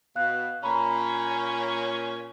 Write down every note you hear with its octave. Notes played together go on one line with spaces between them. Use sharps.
B2 F5 F#6
A#2 C#4 A#5 B5